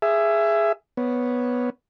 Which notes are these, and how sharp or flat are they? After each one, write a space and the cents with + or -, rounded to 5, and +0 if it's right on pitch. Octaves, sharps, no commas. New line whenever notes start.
G#4 +0 E5 +20
B3 +0 C#5 +0